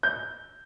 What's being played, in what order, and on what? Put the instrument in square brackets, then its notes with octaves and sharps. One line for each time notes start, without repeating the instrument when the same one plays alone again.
[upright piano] G6